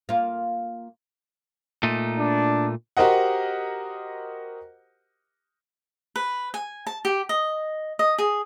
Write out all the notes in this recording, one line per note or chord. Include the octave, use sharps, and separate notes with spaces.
A#3 F4
A#2 A3 D#4
D4
F#4 G4 A#4 C5 D#5 F#5
B4
G#5
A5
G4
D#5
D#5
G#4